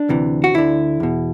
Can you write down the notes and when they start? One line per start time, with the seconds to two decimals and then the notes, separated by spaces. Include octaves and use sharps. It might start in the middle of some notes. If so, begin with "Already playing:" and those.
Already playing: D4
0.09 D2 C3 E3
0.44 F#4
0.54 D2 D3 E4
1.00 E2 B2